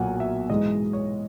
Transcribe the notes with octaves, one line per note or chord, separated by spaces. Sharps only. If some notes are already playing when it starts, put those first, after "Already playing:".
Already playing: B1 A#2 F#3 A#3 F#5 G#5
E5
G#2 E3 G#3 D#5
C#5